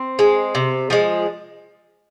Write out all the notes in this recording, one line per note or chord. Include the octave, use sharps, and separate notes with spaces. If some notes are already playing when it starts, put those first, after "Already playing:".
Already playing: C4
G#3
C3
F3 G#3